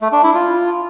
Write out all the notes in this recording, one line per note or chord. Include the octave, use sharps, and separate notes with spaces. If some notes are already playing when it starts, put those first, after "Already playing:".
A3
D4
E4
F4